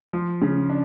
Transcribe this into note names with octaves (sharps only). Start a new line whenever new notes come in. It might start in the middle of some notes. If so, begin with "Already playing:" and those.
F3
C#3
D4